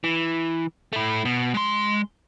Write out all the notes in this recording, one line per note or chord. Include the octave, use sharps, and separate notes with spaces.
E3
A3 E4
B2
G#3 C6